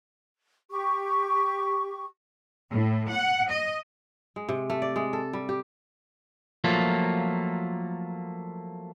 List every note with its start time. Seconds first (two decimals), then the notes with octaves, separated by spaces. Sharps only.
0.70 G4 C#6
2.70 A2
3.10 F#5
3.50 D#5
4.36 G#3
4.49 C3
4.70 A3
4.82 D5
4.96 G#3
5.13 A4
5.33 G3
5.49 G4
6.64 F3 F#3 A3 A#3 F4